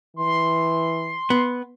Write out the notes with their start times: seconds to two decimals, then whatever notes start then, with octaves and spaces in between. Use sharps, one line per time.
0.16 E3 C6
1.30 B3